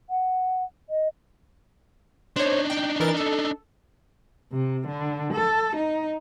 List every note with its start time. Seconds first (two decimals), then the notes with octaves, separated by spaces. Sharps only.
0.10 F#5
0.90 D#5
2.36 D4 D#4 C5 C#5
2.70 G5
3.00 E3 A#4 A6
3.17 A4
4.53 C3
4.87 D3
5.33 A4
5.76 D#4